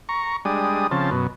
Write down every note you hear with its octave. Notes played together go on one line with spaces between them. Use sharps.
A#5 C#6
G3 G#3 D4 D#6
C#3 F3 C4 A5
F#2 B2